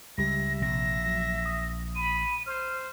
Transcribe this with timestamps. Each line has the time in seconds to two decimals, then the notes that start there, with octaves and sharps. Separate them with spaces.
0.18 C#2 G3 G4 E5 A#6
0.62 A#1 C3 A#6
1.06 F#3
1.46 D#6
1.96 B5 D#7
2.46 C5 F6